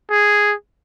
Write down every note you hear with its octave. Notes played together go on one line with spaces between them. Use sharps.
G#4